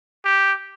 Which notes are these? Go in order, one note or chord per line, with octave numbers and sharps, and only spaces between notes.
G4